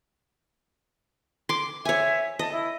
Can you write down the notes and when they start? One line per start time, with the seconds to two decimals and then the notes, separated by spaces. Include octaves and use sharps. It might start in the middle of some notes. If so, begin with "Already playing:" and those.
1.49 C6 D6
1.85 C#5 E5 G#5
2.39 D#5 A5
2.52 E4